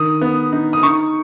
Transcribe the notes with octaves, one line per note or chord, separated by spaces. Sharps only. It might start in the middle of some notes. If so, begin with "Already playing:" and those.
Already playing: D#3 D#6
B3
D#4
D#6
D#4 C#6